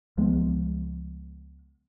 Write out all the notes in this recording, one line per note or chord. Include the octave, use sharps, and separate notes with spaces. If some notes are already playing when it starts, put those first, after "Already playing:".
C#2 F3 G#3 B3